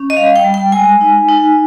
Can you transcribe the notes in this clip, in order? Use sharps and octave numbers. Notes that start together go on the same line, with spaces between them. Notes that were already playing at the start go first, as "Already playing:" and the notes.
Already playing: C#4
D#5
G3 F5
G5
G3
G5
G#3 G#5
D#4
D#4